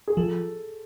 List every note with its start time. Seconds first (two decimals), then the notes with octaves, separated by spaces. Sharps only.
0.08 G#4
0.17 F3 A4